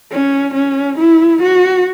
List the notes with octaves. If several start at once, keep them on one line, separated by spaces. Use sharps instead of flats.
C#4
C#4
E4
F#4